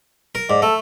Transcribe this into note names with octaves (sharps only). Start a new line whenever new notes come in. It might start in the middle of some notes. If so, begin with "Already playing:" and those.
A#4
G#2 D5
A3 A4